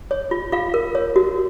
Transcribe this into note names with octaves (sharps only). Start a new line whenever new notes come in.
C#5
F4
F4 F5
A#4
C#5
F#4